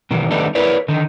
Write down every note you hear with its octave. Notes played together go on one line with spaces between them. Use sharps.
B2 D#3 E3 G3
D#3 G3 A3 B3 D4 D#4
E4 A#4 B4 C#5 D5
D3 D#3 D#4